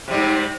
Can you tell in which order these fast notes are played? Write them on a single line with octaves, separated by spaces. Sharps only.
C3 G3 G#2